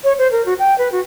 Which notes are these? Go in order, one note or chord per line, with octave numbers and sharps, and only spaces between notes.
C#5
C5
A#4
F#4
G5
B4
F#4